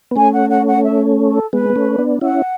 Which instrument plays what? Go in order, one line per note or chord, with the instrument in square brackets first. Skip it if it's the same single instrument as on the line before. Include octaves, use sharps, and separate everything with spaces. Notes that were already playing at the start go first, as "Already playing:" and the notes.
[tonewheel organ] B3
[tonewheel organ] A3 C#4 [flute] G#5
[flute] F#5
F#5
F#5
E5
A4
[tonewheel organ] G#3 B3 [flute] B4
[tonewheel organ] B3
A3 C#4
B3 D4
[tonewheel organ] C#4 E4 [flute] F#5